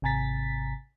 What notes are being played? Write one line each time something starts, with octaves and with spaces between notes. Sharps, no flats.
G#1 C3 G#5 A#5 A6 B6